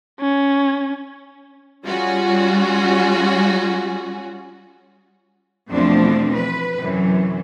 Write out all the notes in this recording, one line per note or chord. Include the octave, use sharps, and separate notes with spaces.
C#4
G3 C#4 F4 F#4 G#4
E2 B2 F3 A3 C4 D4
B4
F#2 C3 E3 F#3